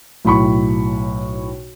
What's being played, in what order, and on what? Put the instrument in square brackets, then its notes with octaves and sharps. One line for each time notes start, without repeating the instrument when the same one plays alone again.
[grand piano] B1 A2 B5 C#6